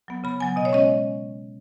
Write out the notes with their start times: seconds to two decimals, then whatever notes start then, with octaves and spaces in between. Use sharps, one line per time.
0.08 F#3 B3
0.24 C#3 B5
0.40 F#3 B3 G#5
0.56 B2 D#5
0.65 C#5
0.73 G#3 C#4 D#5